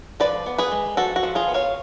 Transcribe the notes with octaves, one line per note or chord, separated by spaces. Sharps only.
F3 B4 D5
B3
G#4 B4
G#3
F3 F#4 A4
F#4
F3
F4 G#4
B3
C#5 F5